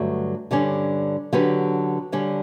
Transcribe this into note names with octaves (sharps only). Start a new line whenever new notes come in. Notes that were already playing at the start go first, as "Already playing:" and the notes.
Already playing: G2 D3 F#3 A3
G2 D3 G3 C#4
D3 F#3 C#4 G4 B4
D3 G3 C#4